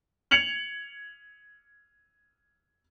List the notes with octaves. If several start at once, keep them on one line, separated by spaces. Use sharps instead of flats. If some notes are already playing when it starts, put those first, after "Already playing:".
G#6 C#7 F7 F#7